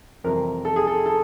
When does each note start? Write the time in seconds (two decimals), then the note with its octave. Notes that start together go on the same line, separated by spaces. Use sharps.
0.24 F2 C3 E3 G3 A#4
0.65 A4
0.76 G#4
0.87 A4
1.06 A4